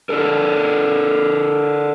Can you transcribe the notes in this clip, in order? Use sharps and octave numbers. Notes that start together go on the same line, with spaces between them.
D4 A4 A#4